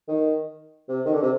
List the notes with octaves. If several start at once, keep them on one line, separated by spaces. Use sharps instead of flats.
D#3
C3
D#3
D3
C3